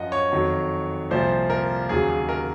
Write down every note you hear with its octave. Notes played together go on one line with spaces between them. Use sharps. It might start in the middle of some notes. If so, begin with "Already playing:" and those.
Already playing: F#2 F3 D#5 F#5
C#5
F2 D#3 F#3
C2 A#2 F3 C5
A#4
D#2 C#3 F#3 G#4
G#4
A#4